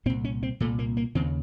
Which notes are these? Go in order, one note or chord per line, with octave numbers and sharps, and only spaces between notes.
C2 A#2 C4
C#4
C4
C2 A#2 A3
A#3
A#3
D#2 C#3 C4